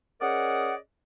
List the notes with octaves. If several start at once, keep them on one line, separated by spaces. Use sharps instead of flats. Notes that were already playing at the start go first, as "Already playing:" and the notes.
C#4 G#4 A#4 D5 D#5 F#5